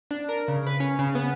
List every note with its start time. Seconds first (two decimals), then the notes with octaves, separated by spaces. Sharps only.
0.11 D4
0.29 A#4
0.48 C#3
0.67 B4
0.80 C#4
0.99 C#3
1.15 B3